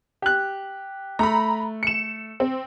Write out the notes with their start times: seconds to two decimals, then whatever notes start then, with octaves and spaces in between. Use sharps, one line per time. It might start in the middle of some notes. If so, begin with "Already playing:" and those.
0.22 G4 F#6
1.19 A3 A#5 B5
1.83 C#7 E7
2.40 C4